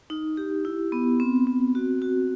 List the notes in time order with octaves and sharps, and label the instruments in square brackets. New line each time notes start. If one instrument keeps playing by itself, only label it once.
[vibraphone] D#4
G4
E4
B3
C4
C4
F#4
F#4